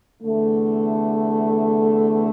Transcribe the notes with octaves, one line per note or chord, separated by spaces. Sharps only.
E2 D3 A3